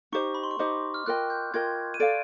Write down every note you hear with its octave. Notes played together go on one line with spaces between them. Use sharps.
D#4 G4 C5 D#5 C#6
B5
C6
C#6
D#4 G4 C5 D#5 D6
F6
F4 A#4 D#5 G5 F#6
G6
F4 A#4 D#5 G5 G#6
D#7
A4 D5 F5 D7